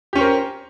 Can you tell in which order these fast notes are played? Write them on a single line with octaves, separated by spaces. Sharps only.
G4 C#4 C5 A#4